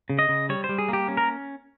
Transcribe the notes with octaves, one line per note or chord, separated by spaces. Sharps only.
C#3
D#5
C#3
G3 C#5
C5
G3
G#4
A#3 G4
C#4
A#4